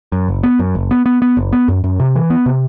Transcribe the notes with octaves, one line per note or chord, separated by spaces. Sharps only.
F#2
F#1
B3
F#2
F#1
B3
B3
B3
F#1
B3
F#2
F#2
C3
E3
B3
C3